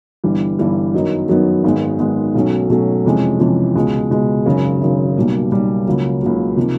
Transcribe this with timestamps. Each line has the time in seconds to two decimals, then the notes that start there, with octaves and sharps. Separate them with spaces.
0.24 G1 G2 E3 G3
0.59 G1 G2 E3 G3
0.94 F#2 D#3 F#3 B3 D#4
1.29 F#2 D#3 F#3 B3 D#4
1.64 G#1 G#2 D#3 G#3 B3
1.99 G#1 G#2 D#3 G#3 B3
2.35 B1 B2 F#3 A3 C#4
2.70 B1 B2 F#3 A3 C#4
3.05 F2 C3 E3 G#3 C#4
3.40 F2 C3 E3 G#3 C#4
3.75 C#2 B2 G#3
4.10 C#2 B2 G#3
4.46 G#1 F#2 C#3
4.81 G#1 F#2 C#3
5.16 B1 B2 G3 A#3
5.51 B1 B2 G3 A#3
5.86 C#2 C#3 F#3 A#3
6.22 C#2 C#3 F#3 A#3
6.57 C3 F3 A#3 D#4